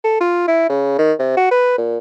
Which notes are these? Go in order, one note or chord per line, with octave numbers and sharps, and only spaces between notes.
A4
F4
E4
C#3
D#3
C3
F#4
B4
A#2